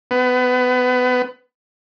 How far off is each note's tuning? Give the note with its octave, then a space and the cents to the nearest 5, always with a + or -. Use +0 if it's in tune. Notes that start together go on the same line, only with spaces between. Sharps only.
B3 +25